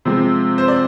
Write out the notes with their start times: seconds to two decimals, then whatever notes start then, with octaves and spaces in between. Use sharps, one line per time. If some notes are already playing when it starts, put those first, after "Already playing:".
0.05 C3 F3 G#3 C4
0.58 C5
0.68 D5